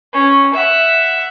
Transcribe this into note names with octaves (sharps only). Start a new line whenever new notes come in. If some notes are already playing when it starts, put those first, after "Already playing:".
C#4
E5 F#5